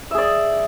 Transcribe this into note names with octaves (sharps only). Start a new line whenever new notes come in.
G#4 D5 E5